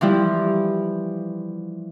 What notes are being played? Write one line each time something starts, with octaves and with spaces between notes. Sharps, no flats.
E3 F3 G3 E4